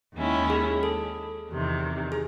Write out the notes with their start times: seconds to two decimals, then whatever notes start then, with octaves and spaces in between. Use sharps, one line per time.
0.15 D#2 D#3 G#3 C#4 E4
0.50 G#4
0.83 A4
1.51 E2 C3 D#3
2.12 G#4